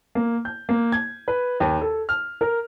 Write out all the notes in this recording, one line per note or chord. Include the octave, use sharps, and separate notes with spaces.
A#3
G6
A#3
G#6
B4
D#2
A4
F6
A#4